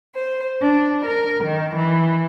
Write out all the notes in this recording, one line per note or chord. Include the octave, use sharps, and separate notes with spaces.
C5
D4
A#4
D#3
E3